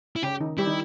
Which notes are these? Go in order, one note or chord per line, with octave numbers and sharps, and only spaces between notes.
E4
C#3 C#4 G4
D#3 D#4
G3 E4 G4
D#3 D#4